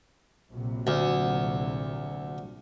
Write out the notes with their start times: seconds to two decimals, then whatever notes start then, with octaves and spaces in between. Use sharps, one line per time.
0.53 A#1 C3 F#3
0.87 D2